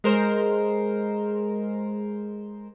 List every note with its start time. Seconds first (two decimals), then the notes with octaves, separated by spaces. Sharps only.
0.04 G#3 A#4 C5